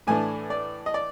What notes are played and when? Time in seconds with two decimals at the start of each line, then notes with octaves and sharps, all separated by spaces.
0.07 A2 E3 A3 D4 G#5
0.50 D5
0.86 D#5
0.94 D5